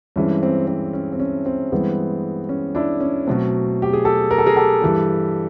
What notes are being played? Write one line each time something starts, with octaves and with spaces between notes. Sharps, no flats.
G2 E3 G#3 C4 C#4
C4
C4
C#4
C4
C#4
C4
G2 E3 G#3 B3
C#4
D4 E4
C#4
B2 F#3 A3 C4
G4
G#4
G4 A4
A#4
A4
G#4 A#4
G4 A4
G2 E3 G3